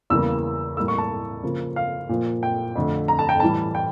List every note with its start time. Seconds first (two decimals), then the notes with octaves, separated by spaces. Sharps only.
0.10 E2 C#3 E3 G3 A#3 E6
0.77 A2 G3 A#3 E6
0.88 C#6
0.98 A5
1.43 C#3 F3 A#3
1.76 F5
2.09 A#2 F3 A#3
2.43 G5
2.75 F2 D3 A3
3.08 A#5
3.19 A5
3.29 G5
3.40 A2 E3 G3 A5
3.75 G5